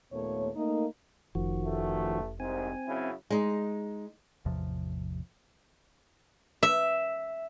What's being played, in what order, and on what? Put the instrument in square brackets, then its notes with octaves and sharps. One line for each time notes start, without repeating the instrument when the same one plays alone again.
[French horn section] D#2 A#2 A3 B3 C#5
A3 A#3 D#4
[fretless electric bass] F1 [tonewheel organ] D#3 F3 F#4
[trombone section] A1 A3
[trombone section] C2 G#2 [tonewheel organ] C4 G#5
[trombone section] F#2 C#3 E4
[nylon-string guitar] G#3 D#4
[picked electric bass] A1 E2 C3 F3
[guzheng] E5